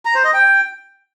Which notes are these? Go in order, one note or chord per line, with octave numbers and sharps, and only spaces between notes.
A#5
C5
D#5
G5